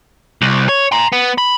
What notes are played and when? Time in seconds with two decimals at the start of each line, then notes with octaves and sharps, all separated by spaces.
0.42 C2
0.69 C#5
0.92 A#5 C6
1.12 B3
1.38 B5